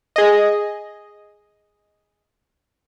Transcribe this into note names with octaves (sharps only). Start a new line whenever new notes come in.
G#4 D#5